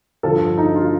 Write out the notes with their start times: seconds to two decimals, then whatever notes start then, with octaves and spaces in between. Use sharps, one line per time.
0.23 G2 D3 F3 A4
0.58 D#4
0.75 F4